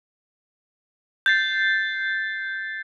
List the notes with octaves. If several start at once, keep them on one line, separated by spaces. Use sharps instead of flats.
G6 A6 C7